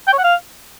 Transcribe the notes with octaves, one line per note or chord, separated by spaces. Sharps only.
G5
C#5
F#5
F5